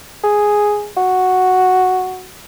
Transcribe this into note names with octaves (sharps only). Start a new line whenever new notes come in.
G#4
F#4